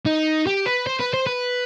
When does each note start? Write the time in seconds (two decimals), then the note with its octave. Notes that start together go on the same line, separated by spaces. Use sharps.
0.06 D#4
0.46 G4
0.66 B4
0.86 C5
1.00 B4
1.13 C5
1.27 B4